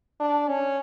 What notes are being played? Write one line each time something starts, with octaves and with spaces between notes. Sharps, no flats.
D4
C#4